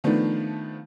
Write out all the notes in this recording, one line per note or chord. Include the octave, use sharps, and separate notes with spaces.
D#3 F3 A3 B3 D4 D#4